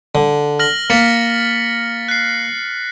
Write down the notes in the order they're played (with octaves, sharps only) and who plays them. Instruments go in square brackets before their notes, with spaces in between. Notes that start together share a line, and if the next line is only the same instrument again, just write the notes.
[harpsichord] D3
[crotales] F6 A#6 F#7
[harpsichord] A#3 [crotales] A6 B6 C#7
[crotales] F#6 C7